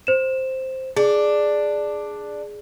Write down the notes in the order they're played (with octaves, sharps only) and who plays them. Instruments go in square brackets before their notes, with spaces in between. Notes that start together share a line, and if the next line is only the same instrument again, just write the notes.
[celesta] C5 E7
[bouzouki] D4 [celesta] G#4